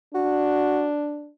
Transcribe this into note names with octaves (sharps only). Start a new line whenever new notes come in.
D4 F#4